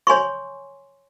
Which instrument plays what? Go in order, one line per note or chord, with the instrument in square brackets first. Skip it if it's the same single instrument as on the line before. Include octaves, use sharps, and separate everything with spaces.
[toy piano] C#5 G#5 C6 C#6